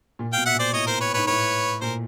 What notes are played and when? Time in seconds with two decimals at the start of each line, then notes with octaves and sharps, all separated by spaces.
0.19 A#2
0.32 B2 F5 G5
0.46 E5 F#5
0.55 A#2
0.59 C5 D5
0.73 A2 C#5 D#5
0.87 A#4 C5
1.00 B4 C#5
1.14 G#2 B4 C#5
1.27 A2 B4 C#5
1.81 A#2 A#4 C5